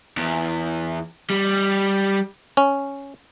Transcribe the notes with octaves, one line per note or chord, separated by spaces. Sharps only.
E2
G3
C#4